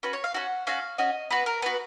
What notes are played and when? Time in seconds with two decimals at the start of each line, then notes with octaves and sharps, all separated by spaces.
0.03 C#4 F#4 B4
0.13 C#5
0.24 F5
0.34 C#4 F#4 F#5
0.67 C#4 F#4 F5
0.98 C#4 F#4 D#5
1.31 B3 F#4 B4
1.46 A#4
1.62 B3 F#4 B4